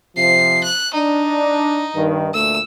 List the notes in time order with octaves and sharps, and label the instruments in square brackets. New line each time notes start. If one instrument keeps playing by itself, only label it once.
[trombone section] C3 F3 [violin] C7
[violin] F#6
[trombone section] D4 [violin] D#4
[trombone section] G2 D#3
[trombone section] D2 A#2 A3 [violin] E6